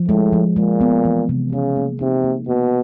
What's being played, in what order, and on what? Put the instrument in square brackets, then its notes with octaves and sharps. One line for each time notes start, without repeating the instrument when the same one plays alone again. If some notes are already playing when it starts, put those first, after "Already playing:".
Already playing: [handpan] F3
[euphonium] A2 [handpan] G#3
[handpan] F3
[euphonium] A#2 [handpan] G#3
[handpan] B3
E3
C3
[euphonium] C#3 [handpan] G#4
[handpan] A#3
[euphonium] C3 [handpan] D#4
[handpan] A#3
[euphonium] B2 [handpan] A#3